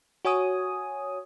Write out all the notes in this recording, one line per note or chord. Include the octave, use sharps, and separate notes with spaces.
F#4 C#5 G#5 D#6